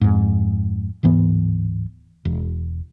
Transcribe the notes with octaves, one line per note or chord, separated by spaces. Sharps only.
F2 G#2
D1 G#2 E3 B3
E1